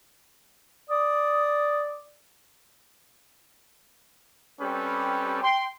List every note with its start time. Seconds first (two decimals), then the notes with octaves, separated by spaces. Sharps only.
0.90 D5 D#6
4.61 G3 C4 C#4 G4 A4 B4
5.43 G5 C6